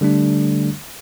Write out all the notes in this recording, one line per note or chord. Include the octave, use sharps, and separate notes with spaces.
D3 G3 A3 D4